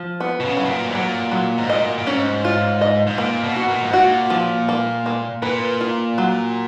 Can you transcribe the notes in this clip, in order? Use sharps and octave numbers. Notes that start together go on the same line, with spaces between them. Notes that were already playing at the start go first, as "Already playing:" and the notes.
Already playing: F3
B3
B2
C#3
F#3
B2
A#2
G#2
A#2 F#3
F#3
G#2
A#2 D#5
A#2
G#2 C#4
F4
D#5
G#2
A#2 A#3
B2
F#4
A#2
G#2
A#2 F#4
F3
A#3
A#3
A#2 B4
F4
F#3